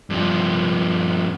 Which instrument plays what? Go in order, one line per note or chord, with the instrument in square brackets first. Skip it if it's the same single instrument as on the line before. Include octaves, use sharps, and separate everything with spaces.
[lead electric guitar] G2 F3